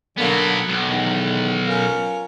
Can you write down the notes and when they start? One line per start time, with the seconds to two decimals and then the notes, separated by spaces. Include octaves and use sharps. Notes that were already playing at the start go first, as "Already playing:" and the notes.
0.18 D3 F#3 A#3 B3
0.69 B1
0.88 E2 D#3
1.66 C#4 F4 A#4